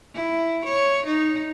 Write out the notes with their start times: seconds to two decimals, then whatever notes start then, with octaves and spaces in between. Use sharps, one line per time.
0.14 E4
0.65 C#5
1.06 D#4